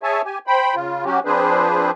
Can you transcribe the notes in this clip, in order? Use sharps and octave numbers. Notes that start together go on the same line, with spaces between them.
G#4 C#5 E5 G#5 A5
G4 G#5
C5 G5 B5
C#3 F4
F#3 C#4 F#4 G4
F3 C4 D4 G#4 B4 C5